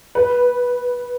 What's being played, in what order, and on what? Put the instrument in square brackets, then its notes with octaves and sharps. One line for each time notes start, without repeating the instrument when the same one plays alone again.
[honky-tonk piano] B4